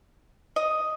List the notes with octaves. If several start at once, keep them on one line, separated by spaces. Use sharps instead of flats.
D#5